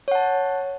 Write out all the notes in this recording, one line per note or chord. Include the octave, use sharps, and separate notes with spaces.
C#5 F#5 A5